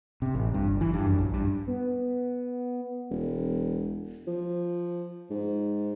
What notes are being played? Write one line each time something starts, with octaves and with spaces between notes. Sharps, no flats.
C3
A1
G2
G1
E3
G2
F#2
A#1
G2
B3
E1
F3
G#2